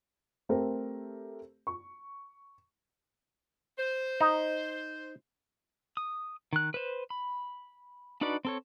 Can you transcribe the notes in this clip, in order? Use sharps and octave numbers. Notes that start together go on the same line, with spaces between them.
A3 C4 G4 A4 A#4 C5
C#6
C5
D#4
D#6
D#3 F#6
B4 C5
B5
D4 D#4 F#4 B4 D5
C4 A4 C#5